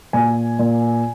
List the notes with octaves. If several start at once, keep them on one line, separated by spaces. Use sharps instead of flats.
A#2 G#5
A#2